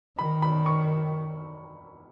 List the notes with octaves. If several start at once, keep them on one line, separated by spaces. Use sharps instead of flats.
D#3 B5
B5
C#6